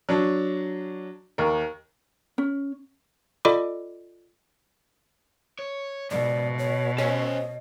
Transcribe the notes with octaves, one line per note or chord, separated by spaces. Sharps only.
F#3 D4
D#2 A#4
C#4
F4 A4 D5 D#5 B5 D6
C#5
C#2 G#2 B2 D5
C#5
C#4 A4 C5 D#5